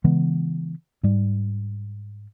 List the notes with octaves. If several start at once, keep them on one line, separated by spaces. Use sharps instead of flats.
C#3 E3 G#3 B3
G#2 G3